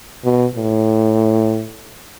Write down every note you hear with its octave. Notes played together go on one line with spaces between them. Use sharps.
B2
A2